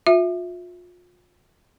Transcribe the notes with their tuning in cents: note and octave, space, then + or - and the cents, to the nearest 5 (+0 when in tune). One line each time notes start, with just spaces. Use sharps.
F4 +35 E5 +0